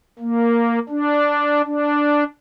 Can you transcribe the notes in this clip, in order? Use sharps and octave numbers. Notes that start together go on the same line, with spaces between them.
A#3
D4
D4